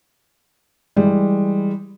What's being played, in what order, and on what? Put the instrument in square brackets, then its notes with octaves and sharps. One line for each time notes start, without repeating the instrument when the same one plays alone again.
[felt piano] E3 G3 G#3